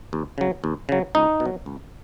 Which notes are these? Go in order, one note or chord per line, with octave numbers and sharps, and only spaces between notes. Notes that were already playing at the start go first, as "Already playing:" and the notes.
D#2
C#3 F#3
D#2
C#3 F#3
C#2 D#4
B2
F#3
C#2